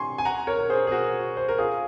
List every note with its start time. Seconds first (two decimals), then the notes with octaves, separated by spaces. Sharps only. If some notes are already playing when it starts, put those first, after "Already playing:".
Already playing: G#5 C6 C#6
0.18 G#5
0.25 F#5 A#5
0.47 A#4 C#5
0.59 A#4
0.69 G#4 C5
0.87 G#4
0.91 F#4 A#4
1.37 C5
1.49 A#4
1.58 F4 G#4